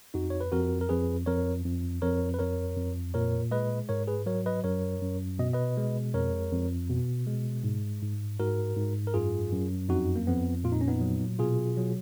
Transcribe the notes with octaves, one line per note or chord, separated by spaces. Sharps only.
F2 D#4 F#4
C#5
B4
F2 F#4 A#4
A#4
F2 G#4 B4
F2 A#4 C#5
F2
F2 A#4 C#5
B4
F2 A#4 C#5
F2
A#2 A#4 C#5
G#3 B4 D#5
G#2 A#4 C#5
G#4 B4
F#3 A#4 C#5
B4 D#5
F#2 A#4 C#5
F#2
B2 D#5
B4 D#5
G#3
F2 A#4 C#5
F2
B2
G#3
G#2
G#2
G#2 F#4 A#4
G#2
A#4
F#2 F4 G#4
F#2
F2 D#4 F#4
A#3
F2 B3
A#2 F4
D#4
C#4
B3 D#4
F#3
B2 F4 G#4
F#3